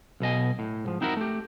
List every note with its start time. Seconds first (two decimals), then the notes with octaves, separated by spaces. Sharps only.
0.20 B1 B2 D#5 G#5
0.59 A2
0.85 G#2 F3
1.01 C4 D#4 E4 F#4 A#4
1.17 A3 G4